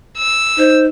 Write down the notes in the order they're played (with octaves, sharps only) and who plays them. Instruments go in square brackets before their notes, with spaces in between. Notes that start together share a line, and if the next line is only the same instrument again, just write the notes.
[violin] E6
[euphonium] D#4 [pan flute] C5